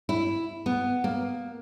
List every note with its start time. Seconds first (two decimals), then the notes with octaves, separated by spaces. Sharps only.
0.09 E4
0.66 B3
1.04 A#3